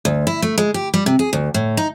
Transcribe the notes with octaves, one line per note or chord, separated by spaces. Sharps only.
D2
E4
A3
G#3
G4
G3
C3
G#4
D2
A2
D#4